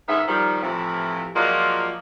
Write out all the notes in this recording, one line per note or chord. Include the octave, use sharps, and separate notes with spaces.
G#2 D#3 B3 C#4 E5
D#3 F3 G3
A2 C3 E3 F3
F3 F#3 G#3 A#3 F4 D5